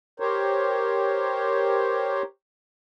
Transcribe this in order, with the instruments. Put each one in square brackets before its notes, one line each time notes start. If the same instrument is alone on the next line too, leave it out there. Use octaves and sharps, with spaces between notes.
[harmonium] G4 A#4 C5 C#5